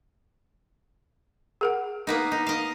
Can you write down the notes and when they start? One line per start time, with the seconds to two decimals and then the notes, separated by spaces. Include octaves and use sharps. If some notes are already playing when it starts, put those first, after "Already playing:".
1.61 G#4 A#4 F#5
2.07 A#3 B3 D#4
2.32 D#4
2.47 D#5 F5